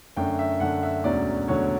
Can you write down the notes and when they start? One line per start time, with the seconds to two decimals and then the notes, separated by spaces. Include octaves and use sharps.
0.17 F#2 D3 A3 D4 G5
0.39 E5
0.60 F#2 D3 A3 D4 F#5
0.83 E5
1.04 E1 D2 D3 F#3 C#4 D5
1.48 E1 D2 D3 F#3 C#4 C#5